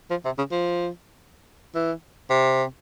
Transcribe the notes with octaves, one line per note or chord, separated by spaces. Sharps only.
F3
C3
C#3
F3
E3
C3